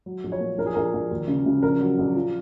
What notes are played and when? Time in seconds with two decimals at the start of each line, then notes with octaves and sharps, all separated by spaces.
0.06 F#3
0.24 A#1
0.32 C#5
0.40 A#2
0.58 A#1 A#4
0.66 G#4
0.74 A#1 A#4
0.94 A#1
1.11 D#2
1.28 C#3
1.46 C#3
1.62 A#1 A#4
1.80 F#3
1.98 A#1
2.16 F3